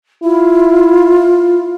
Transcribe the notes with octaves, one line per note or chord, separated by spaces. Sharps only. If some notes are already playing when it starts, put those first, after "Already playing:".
E4 F4